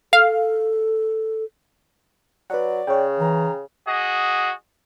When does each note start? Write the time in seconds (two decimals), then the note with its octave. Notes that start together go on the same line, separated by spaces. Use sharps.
0.13 A4 F5
2.50 F#3 B4 D5 F#5
2.87 C#3 C#5 G5
3.20 E3 A#5
3.87 F#4 G#4 D#5